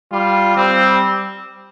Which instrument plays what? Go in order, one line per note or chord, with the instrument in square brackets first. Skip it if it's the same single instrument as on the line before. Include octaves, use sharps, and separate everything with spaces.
[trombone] G3 [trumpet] F4
[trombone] G3 [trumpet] C4